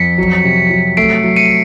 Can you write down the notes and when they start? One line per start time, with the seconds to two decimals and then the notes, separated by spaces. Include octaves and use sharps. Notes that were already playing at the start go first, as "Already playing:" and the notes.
Already playing: F2 B6 C#7
0.18 F#3
0.44 C3
0.70 F#3
0.97 A3 C7 D7
1.24 F#3
1.36 C#7 D#7